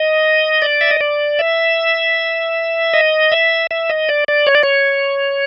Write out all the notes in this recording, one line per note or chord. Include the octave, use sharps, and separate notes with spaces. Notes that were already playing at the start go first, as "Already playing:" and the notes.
Already playing: D#5
D5
E5
D#5
D5
E5
D#5
E5
E5
D#5
D5
D5
C#5
D5
C#5